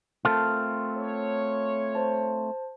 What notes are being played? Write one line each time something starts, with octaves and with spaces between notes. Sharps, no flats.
A3 C4 F4 A4 A#4 A5
C#5
C5 A5